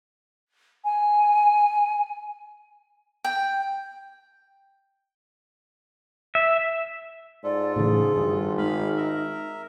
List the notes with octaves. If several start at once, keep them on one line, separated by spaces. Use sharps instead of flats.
G#5
G5
E5
G#2 F4 A4 D5
A2 C#3 E3 G#4
G#1 G2
G#3 D#4 F5 B5
A#4 E5